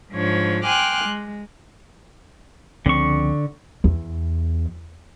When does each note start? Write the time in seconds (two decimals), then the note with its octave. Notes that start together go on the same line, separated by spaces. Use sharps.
0.12 G#2 F3 D4 C#5
0.64 G5 G#5 C6 D6 F6 F#6
1.05 G#3
2.86 C#2 D3 F3 C4 C#6
3.84 E2